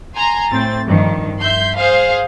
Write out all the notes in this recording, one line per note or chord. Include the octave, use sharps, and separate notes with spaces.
G#5 A#5 C6
A2 C4 A6
G2 D#3 F3
E5 C6 G6
G#4 C5 F5